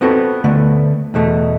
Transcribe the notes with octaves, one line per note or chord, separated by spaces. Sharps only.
B3 C4 F#4 A4 B4
D3 A3 B3
E2 B2 A3